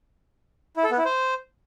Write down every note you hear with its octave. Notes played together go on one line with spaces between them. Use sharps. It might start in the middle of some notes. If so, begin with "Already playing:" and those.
E4
A4
B3
E4
C5